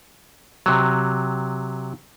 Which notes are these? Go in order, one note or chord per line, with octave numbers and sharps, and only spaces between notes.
C3 F#3